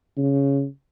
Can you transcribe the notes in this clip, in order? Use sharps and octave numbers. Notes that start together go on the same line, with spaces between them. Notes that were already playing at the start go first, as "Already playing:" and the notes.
C#3